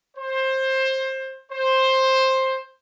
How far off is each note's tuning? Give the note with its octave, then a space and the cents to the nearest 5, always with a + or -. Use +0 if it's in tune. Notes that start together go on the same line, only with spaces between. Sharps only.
C5 +20
C5 +10